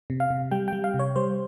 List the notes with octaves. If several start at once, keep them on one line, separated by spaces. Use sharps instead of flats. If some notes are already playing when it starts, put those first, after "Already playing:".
C3
F5
C3
G3 G5
G5
G3
F5
C3
C#5
G3 C5